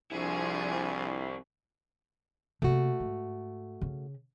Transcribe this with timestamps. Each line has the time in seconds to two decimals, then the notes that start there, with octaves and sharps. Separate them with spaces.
0.11 C2 F3 C4 D4 E4 G#4 G#5
2.62 C3 A3 A#3 F#4
3.00 G#2
3.81 C#3